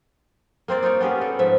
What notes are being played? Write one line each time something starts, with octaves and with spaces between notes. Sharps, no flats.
A#3 C4 C5 D5
D#4 F4 C#5 D5
B3 C#4 G4 G#4
A4
G#2 F3 E5